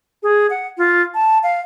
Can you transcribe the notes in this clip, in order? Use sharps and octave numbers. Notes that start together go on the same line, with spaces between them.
G#4
F#5
F4
A5
F5